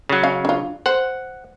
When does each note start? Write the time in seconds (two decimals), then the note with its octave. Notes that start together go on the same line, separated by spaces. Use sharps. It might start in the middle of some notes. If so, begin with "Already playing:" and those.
0.09 C#3 F#3
0.23 C#4 F5
0.45 D4 F4
0.86 C5 F#5